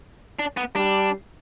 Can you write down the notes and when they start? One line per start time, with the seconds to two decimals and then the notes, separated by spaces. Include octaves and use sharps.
0.39 D4
0.57 B3
0.75 G3 D4